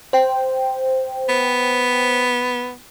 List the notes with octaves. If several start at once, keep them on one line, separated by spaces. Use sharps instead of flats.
C5 G5
B3